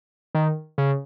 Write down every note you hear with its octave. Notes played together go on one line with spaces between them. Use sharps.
D#3
C#3